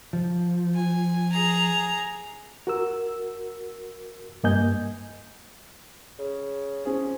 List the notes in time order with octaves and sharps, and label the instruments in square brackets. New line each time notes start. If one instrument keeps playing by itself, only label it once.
[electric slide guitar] F3
[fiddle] G#5
G#4 A#5
[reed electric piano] F#4 A#4 E6
G2 A#3 D#5 G#5 G6
[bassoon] C#3
[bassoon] F3 [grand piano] C#4 G#4